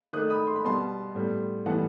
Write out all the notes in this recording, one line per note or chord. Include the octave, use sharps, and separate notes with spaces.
D#3 A3 D#6 F#6
B5 D#6
C6
B5
B2 G3 B3 A5 C6
A2 G3 B3
A2 E3 G3 B3 F#5 A5